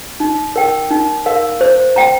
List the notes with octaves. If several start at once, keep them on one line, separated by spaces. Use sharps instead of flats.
D#4
A#4 G5
D#4
A#4 F5
C5
G5 A#5